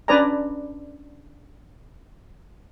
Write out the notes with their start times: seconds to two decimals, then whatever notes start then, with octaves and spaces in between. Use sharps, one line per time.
0.08 C#4 D4 B4 D5 G#5 A#5